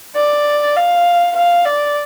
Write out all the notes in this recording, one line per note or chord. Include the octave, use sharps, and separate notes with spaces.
D5
F5
F5
D5